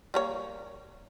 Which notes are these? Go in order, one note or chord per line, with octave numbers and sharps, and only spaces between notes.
G3 A#3 C#5